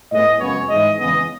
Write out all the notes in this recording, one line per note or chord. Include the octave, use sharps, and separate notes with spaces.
A2 G#3 B3 D#5
F#2 C#3 G#3 B3 C#5
G#2 E3 G#3 D#5
E2 C#3 G#3 B3 D#5